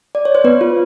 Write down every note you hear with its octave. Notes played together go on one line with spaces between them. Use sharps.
D5
C#5
C5
B3 B4
F4